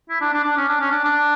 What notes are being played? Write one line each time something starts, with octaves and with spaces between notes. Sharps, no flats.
E4
D4
D4
D4
C#4
D4
C#4
D4
D4